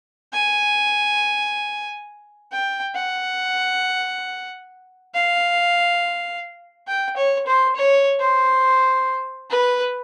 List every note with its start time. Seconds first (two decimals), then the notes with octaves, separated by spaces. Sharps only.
0.33 G#5
2.52 G5
2.95 F#5
5.14 F5
6.88 G5
7.17 C#5
7.47 C5
7.76 C#5
8.19 C5
9.51 B4